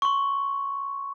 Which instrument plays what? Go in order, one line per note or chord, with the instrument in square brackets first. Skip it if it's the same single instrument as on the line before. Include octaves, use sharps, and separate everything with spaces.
[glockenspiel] C6 C#6